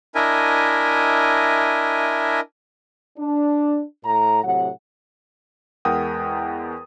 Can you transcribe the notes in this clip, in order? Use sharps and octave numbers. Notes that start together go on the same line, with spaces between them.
D4 E4 A#4 D#5 E5 G#5
D4
A2 A#5
A2 C3 F#3 F#5
E2 G#3 A#4 F#5 G5 D#6